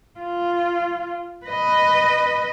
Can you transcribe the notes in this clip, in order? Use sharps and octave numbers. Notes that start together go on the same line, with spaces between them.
F4
B4 D#5